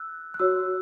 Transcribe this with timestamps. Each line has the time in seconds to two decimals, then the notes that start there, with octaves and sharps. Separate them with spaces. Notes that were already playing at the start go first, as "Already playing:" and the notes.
Already playing: E6 F#6
0.34 F#6
0.39 F#4 C#5 E6